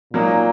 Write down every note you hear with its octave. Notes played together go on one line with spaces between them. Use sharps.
A#2 F#3 A#3 D#4